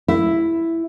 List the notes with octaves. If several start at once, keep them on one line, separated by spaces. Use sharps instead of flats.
E4